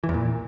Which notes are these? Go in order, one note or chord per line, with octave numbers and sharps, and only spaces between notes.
E3
E2
A#2